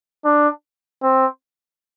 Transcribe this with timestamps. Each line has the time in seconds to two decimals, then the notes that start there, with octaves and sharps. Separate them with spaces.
0.25 D4
1.03 C4